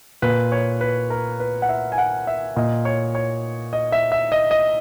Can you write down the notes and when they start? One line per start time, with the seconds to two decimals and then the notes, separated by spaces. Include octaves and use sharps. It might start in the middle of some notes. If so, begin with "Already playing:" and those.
0.22 A#2 B4
0.52 C#5
0.81 B4
1.10 A#4
1.40 B4
1.62 F#5
1.69 E5
1.92 G#5
1.98 F#5
2.27 E5
2.56 A#2 D#5
2.85 C#5
3.15 C#5
3.73 D#5
3.92 E5
4.12 E5
4.32 D#5
4.51 D#5